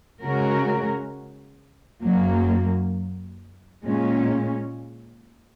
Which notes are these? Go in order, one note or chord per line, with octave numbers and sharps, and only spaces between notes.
C#3 G#3 C#4 F#4 A#4
F#2 F#3 A#3
A#2 G#3 C#4